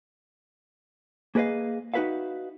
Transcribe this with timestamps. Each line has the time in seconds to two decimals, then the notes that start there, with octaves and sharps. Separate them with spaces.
1.35 A#3 G#4 B4 D5 D#5 F5
1.94 D#4 F#4 G#4 B4 E5 F5